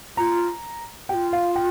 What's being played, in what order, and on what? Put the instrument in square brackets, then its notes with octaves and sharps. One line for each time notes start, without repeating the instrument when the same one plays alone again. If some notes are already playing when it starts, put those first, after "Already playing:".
[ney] F4 [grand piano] A#5
[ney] G4 [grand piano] G5
[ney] F4
[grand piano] F5
G5